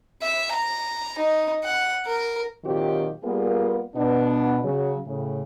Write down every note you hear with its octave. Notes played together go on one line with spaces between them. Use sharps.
E5
A#5
D#4
F#5
A#4
A#2 D#3 F#3 C4 F4 G4
G3 A#3 B3 F4 G#4 A#4
B2 B3 D4
C#3 F#3
A2 C#3